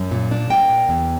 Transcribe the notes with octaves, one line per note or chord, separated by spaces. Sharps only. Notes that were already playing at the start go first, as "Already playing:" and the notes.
Already playing: F#2
A#2
D4
A#3 G5
A#2
E2